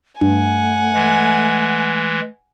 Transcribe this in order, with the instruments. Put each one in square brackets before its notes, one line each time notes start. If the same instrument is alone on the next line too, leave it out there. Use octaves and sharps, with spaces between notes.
[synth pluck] G2 [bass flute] A3 [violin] F#5 G#5
[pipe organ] E3 G#3